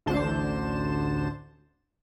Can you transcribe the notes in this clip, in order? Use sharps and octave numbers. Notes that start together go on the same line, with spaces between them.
A1 D2 D3 C5 A5 E7